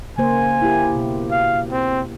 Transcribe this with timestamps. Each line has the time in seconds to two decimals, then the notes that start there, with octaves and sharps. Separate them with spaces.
0.18 C#3 A#3 C5 G#5
0.62 E4 G4
0.95 B2
1.31 F5
1.72 C4